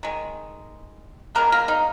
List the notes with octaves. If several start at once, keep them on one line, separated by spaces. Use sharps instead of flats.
D#3 G#3
D#3 G#3 A#3 B3 A#4
A#3 A#4
D#4